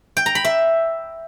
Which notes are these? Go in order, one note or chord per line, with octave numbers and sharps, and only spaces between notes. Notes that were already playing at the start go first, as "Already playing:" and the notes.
G5
A#5
B5
E5